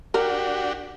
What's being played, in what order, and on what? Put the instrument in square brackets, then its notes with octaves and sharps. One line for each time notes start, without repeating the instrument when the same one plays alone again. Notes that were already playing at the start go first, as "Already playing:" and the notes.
[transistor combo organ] D4 F#4 G4 [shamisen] A#4